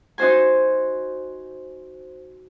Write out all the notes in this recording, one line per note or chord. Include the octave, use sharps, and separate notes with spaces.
D#4 F#4 C5 G#5